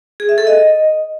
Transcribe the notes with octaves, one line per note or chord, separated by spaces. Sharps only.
G#4
E5
A4
D#5